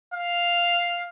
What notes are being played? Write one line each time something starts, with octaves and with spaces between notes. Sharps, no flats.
F5